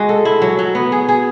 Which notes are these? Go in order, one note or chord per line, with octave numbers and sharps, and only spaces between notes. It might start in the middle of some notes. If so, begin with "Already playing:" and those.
Already playing: G#3 F#4
A4
E4
F#3
F#3
B3
G#4
G#4